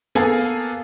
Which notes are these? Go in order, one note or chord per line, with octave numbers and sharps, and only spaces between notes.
A#3 B3 G#4 A4 F5 G#5